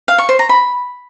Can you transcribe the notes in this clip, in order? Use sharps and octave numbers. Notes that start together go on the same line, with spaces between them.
F5
C#6
C5
A#5
B5